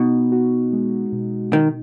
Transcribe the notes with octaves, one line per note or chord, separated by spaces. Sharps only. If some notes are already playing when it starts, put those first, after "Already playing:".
Already playing: B2 D#4
F#4
G#3
B2
D#3 D#4